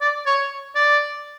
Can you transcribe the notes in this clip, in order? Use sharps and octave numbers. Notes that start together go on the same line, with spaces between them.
D5
C#5
D5